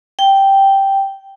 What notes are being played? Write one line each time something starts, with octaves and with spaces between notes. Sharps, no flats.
G5